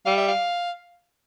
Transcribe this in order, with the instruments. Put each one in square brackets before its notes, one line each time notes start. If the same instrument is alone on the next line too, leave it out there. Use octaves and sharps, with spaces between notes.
[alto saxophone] G3 [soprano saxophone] F5
[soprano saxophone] E5
F5